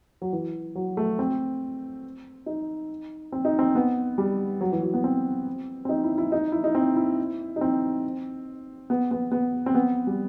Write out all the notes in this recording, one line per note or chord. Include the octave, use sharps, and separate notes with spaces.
F#3
E3
F#3
A3
C4
D#4
C4
D#4
C4
B3
G3
F#3
E3
F#3
B3
C4
C4
D#4
E4
E4
D#4
E4
D#4
C4
E4
D#4
C4
B3
B3
B3
C4
B3
G3